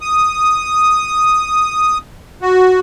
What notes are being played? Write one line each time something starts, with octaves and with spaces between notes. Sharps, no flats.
D#6
F#4